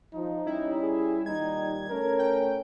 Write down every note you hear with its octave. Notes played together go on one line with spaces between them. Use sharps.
F3 D#4
G3 C#4 E4
G#4
A#2 D#3 G3 D#4 G#6
A2 A3 C#4 A#4
G5